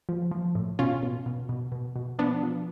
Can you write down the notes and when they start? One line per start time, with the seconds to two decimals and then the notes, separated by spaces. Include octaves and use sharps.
0.09 F3
0.31 F3
0.55 A2
0.79 B2 C#4 F4
1.03 B2
1.26 B2
1.49 B2
1.72 B2
1.96 B2
2.19 F3 B3 D4
2.43 F3